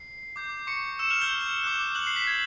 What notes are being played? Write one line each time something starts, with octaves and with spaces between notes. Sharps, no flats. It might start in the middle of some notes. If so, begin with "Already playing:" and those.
Already playing: C7
D6 G6
C#6 C#7
E6 E7
F6 F7
G6 G7
D6 F#6
F#6 F#7
C7
B6
G#6